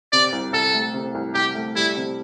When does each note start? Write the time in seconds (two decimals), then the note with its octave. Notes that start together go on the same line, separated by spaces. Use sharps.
0.13 C3 D5
0.33 C2
0.53 C2 A4
0.74 A3
0.94 C3
1.15 C2
1.34 C2 G4
1.55 A3
1.76 G3 E4
1.97 C3